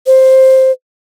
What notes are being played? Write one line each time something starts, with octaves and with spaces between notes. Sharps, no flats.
C5